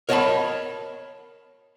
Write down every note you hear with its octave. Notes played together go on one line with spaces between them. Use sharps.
A#4 C#5 D#5 E5 A5 B5